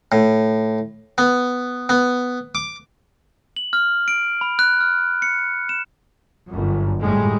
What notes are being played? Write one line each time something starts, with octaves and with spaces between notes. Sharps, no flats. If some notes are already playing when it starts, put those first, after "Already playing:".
A2
B3
B3
D6
F#7
F6
D7
B5
F#6
F6
C#7
E7
G1 F#2
A2 G3 G#3